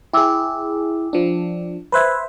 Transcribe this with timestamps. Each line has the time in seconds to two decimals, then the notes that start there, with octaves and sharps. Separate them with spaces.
0.13 E4 G#4 G5 D6 E6
1.13 F3 D4
1.92 B4 C5 E5 B5 F#6 G#6